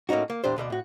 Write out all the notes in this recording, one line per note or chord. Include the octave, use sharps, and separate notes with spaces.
A2 A#3 C#4 D#4 F#4
A#3
E2 A#2 D4 G4 C5
D2 B2 A4 D5
A2 F#4